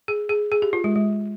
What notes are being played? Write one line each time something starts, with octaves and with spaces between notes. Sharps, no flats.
G#4
G#4
G#4
G4
F4
G#3
G#3